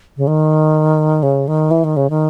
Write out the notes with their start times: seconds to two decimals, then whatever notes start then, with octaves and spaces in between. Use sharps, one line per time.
0.17 C#3
0.27 D#3
1.23 C#3
1.48 D#3
1.71 E3
1.84 D#3
1.97 C#3
2.10 D#3